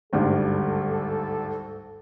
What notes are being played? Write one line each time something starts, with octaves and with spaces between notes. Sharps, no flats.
G#1 D2 G2 A4